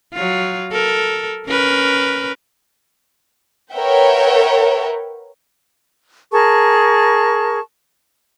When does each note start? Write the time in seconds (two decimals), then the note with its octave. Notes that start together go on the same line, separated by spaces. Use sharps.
0.13 F#3 F4
0.72 A4 A#4
1.47 C#4 A#4 B4
3.74 A#4 B4 C#5 E5 F#5 G5
6.31 G#4 A#4 A5 C#6